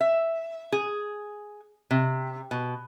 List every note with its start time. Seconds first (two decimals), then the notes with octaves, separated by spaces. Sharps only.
0.01 E5
0.72 G#4
1.91 C3
2.51 B2